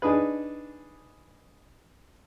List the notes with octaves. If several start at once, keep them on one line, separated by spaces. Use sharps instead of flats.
D4 D#4 G#4 B4